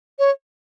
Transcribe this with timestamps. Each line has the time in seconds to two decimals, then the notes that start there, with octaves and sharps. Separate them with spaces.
0.19 C#5